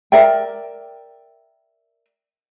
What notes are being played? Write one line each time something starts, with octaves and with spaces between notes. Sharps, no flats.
A#4 D5 E5 G5